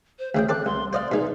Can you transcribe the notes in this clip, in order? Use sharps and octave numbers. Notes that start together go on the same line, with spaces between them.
C5
D2 C#3 G#4 G5
C4 A4 D5 F#6
C2 C6
C5 D5 D#5 F5
B2 G#3 D#4